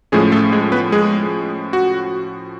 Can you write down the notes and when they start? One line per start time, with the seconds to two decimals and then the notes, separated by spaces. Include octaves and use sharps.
0.12 A2 F3 G#3 A3 C#4 G#4
0.32 A3 A4
0.52 G#3 G#4
0.72 B3 B4
0.92 G#3 G#4
1.73 F#4